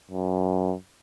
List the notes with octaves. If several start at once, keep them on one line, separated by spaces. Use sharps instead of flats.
F#2